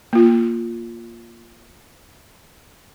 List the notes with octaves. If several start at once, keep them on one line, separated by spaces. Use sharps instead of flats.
A#3 F4